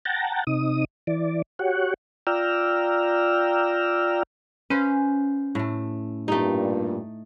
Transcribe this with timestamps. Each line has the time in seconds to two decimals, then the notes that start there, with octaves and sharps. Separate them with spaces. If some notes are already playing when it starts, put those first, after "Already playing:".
0.05 F#5 G5 A5 A#5
0.47 C3 D#4 D#6
1.07 E3 D5
1.59 F#4 G4 C#5 F#5
2.27 F4 D5 G5 A#5 E6 F6
4.70 C#4 B4 C5 F5
5.55 A2 A3
6.28 G2 A#2 A3 D#4 G4